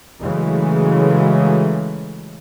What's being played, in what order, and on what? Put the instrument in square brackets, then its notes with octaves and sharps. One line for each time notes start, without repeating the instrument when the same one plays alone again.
[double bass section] C#3 E3 F#3 G#3 A3